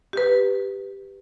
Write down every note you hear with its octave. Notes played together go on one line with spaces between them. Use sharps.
G4 B4